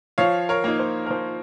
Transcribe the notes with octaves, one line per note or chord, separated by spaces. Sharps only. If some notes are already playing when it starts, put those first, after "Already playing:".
F3 C#5 F5
A#4 C#5
A#3 D#4
C5
A#4
F3 C5